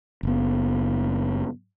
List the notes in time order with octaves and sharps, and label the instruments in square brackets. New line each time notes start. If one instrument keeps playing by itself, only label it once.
[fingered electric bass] F#1 B3